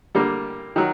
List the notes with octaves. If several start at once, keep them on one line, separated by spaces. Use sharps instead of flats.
D3 G3 A#3
D#3 F#3